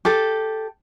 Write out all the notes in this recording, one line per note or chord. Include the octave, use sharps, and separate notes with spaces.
G4 A4